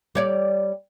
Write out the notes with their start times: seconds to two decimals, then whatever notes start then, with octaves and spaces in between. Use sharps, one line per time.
0.15 G3 C#5 D5